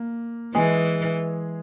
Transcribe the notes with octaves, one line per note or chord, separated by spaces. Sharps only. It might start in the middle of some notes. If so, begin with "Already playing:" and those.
Already playing: A#3
E3 G#3 G#4